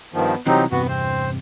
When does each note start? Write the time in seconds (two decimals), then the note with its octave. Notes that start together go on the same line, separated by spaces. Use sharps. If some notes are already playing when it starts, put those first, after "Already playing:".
0.14 G2 D#3 F3 B3
0.47 C2 C3 E3 F#3 C4 D#4 G4
0.72 E2 G2 C3 B3 F#4
0.89 C4 C5